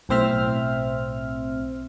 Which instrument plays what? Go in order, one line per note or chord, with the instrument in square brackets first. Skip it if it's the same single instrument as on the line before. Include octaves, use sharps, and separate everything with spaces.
[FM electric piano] B1 A2 C4 C5 E5 F6